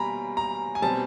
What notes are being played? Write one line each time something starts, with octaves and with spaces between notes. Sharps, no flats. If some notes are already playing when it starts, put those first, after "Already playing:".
Already playing: B2 G3 A#3 G#5 A#5 B5
A#5
G#5
B2 G3 C4 A5